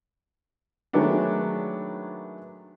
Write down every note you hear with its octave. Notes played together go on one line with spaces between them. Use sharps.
D#3 F#3 G#3 A3 B3 D4